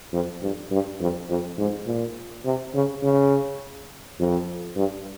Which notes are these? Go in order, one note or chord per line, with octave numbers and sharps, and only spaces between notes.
F2
G2
G2
F2
F2
G#2
A#2
C3
C#3
C#3
F2
G2